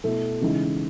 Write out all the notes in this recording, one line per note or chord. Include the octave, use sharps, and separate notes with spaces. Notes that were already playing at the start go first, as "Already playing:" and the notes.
B2 A3 E4
C#3 E3 G#3 D#4